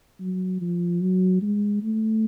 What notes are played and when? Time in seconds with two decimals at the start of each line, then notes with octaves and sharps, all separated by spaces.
0.20 F#3
0.61 F3
1.01 F#3
1.42 G#3
1.83 A3